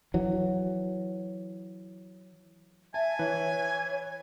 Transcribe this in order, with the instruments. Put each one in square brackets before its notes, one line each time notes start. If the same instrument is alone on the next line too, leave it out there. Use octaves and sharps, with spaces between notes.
[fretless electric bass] E3 F#3
[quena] E5 [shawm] G#5 [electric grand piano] A5
[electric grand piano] E3 B4 [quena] C#5